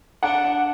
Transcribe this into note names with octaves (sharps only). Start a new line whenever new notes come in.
D4 F#5